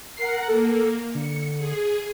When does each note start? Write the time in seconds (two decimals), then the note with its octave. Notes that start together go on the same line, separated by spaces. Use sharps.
0.17 A#4 F#5 C7
0.48 A#3 A4
1.15 D3 C#7
1.58 G#4